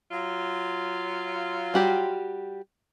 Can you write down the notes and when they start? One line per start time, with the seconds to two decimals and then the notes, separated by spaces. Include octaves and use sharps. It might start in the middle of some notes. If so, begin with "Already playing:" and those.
0.11 F#3 F4
1.74 G3 F#4 G4